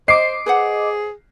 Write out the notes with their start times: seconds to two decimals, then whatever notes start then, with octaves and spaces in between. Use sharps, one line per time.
0.08 C5 D#5 D6 C7
0.46 G#4 B4 C5 F#5